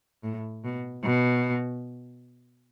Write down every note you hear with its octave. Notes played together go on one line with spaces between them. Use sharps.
A2
B2
B2